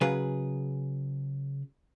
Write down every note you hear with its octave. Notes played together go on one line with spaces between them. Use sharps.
C#3 F#3 G#4 B4